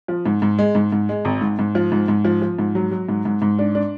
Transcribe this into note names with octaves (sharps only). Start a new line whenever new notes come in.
F3
G#2
G#2
G#3
G#2
G#2
G#3
G#1
G#2
G#2
F3
G#2
G#2
F3
F3
G#2
F#3
F#3
G#2
G#2
G#2
D4
D4